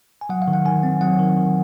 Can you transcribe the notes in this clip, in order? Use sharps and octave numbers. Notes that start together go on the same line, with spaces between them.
G#5
F#3 F#5
F5
D#3
F#5
D#3 G#5
C4
F#3 F#5
D#3
D#3